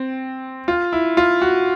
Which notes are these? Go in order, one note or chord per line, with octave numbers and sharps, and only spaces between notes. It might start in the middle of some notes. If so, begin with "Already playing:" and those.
Already playing: C4
F4
E4
F4
F#4